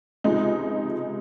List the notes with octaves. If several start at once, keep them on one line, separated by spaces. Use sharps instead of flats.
C#2 C3 F3 G#3 D#4